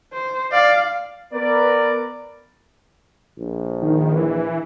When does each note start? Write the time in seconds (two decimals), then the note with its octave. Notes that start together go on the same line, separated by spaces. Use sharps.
0.13 C5
0.52 D5 F5
1.34 B3 A#4 B4 D5
3.39 A#1
3.82 D#3
4.16 E3